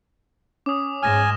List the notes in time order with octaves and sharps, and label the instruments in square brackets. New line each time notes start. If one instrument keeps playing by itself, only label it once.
[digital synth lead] C#4 [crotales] D6 D#6
[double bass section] G#2 G#3 [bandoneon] G#5 [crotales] F6 A#6 E7